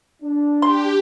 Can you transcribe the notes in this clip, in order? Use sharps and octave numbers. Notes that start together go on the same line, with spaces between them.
D4
G4 C6